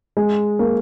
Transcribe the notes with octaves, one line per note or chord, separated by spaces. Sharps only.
G#3
A#3